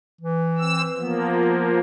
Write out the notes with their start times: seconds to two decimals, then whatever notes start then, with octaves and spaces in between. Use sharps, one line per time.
0.21 E3
0.58 C4 E6
0.97 F3 A#3 B3